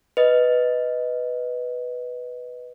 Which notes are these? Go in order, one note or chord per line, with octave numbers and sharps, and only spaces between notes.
B4 D#5